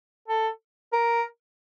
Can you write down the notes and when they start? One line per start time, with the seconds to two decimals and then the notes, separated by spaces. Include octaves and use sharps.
0.28 A4
0.93 A#4